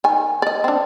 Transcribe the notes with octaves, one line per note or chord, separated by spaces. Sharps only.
D#3 G#5
D5 D#5
C4 D4